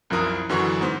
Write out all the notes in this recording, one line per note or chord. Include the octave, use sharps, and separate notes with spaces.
C2 F#2 F3 E4 A#4 D#6
F#2 D3 E3 F#3 F#4 C#6
G#2 B3 C5